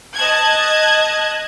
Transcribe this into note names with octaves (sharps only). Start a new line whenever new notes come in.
D#5 A5 F#6 G#6